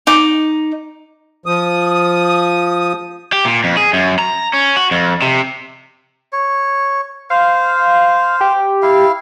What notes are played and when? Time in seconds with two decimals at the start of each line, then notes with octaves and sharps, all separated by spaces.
0.07 D#4 D6
1.46 F3 D#6
3.33 G4
3.45 A#2
3.64 F2
3.77 G#4
3.93 F#2
4.19 A#5
4.54 C#4
4.76 F#4
4.91 F2
5.22 C3
6.32 C#5
7.30 C5 F5
8.41 G4
8.82 E4 F5